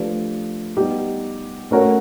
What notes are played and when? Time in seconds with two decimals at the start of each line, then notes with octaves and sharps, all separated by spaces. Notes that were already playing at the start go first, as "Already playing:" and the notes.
Already playing: F3 A3 D4 G4 B4
0.77 G3 B3 D#4 G4
1.71 A3 C#4 F#4 A#4 C#5